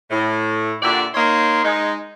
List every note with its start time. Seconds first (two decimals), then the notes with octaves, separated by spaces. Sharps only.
0.11 A2
0.82 A#2 D3 F#4 G4 D5 E5
1.15 A#3 D#4 C#5 C6
1.64 G#3 D#4